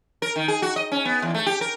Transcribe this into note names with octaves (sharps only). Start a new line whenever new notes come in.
A#4
D#3
G#4
F#4
D#5
C#4
B3
E2
A3
G4
A#4